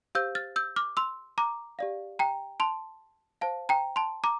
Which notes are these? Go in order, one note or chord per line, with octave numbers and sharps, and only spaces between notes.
G4 C5 F5 E6 G6
F6 A6
E6 G6
D6 F6
C6 E6
A#5 D6
G4 D5 F5
G5 A#5
A5 C6
C5 F5 A5
G5 A#5
A5 C6
A#5 D6